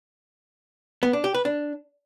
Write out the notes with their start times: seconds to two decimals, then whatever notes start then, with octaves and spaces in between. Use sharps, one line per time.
1.03 B3
1.13 D4
1.24 G4
1.34 B4
1.45 D4